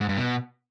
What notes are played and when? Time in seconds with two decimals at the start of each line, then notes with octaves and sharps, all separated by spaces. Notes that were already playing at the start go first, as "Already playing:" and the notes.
0.01 G#2
0.09 G2
0.17 B2